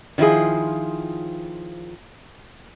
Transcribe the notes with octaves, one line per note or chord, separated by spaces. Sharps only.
D#3 F3 E4 F4 G#4